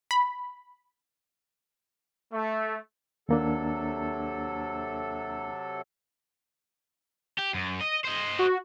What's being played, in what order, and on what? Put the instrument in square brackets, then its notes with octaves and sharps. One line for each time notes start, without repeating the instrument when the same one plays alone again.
[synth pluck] B5
[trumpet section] A3
[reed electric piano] D#2 A#3 D4 [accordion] C3 F#3 A4
[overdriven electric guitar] G4
F#2
D#5
C5 D#5
[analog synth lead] F#4